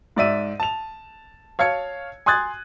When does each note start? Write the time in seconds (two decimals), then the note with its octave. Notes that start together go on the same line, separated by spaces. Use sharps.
0.16 G#2 D5 E5 D#7
0.60 A5 F7
1.59 C#5 F5 A5 G#6 C#7
2.26 G#5 C6 D#6 F#6 G#6 A6